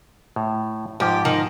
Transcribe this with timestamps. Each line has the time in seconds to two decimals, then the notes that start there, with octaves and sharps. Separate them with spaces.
0.36 A2
1.00 G#2 F3 G4
1.25 D#3